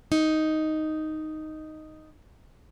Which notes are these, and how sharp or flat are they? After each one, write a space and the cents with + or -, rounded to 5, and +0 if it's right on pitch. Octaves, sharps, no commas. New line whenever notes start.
D#4 +0